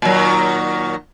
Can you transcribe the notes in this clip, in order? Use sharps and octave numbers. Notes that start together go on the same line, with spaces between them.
A#2 D#3 F#3